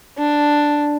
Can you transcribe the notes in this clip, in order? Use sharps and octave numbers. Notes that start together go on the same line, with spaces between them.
D4